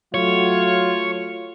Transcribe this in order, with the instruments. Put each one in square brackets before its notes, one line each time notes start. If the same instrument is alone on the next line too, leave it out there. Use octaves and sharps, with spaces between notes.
[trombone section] F#3 A3 [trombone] F4 [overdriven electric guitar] C#5